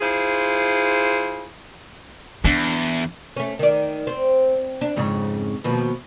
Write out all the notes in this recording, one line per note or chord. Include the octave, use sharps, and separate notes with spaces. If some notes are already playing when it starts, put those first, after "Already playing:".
E4 F4 G#4 C5
E2 D4
A3 C#4
D#3 D5
C4
D4
F2 G#2 C#3
D#2 B2 F3